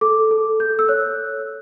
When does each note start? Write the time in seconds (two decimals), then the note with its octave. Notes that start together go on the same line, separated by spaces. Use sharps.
0.01 A4 D6
0.31 A4
0.60 A4 G6
0.79 E6
0.88 C#5 F#6